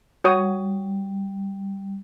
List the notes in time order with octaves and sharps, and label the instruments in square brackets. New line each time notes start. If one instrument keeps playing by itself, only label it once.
[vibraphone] G3 [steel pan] F#4 C#5 D#6